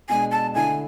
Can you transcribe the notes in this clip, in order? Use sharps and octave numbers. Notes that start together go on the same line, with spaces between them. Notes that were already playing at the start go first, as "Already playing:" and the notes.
B2 G#3 D4 G#5
A5
D3 A3 E4 G#5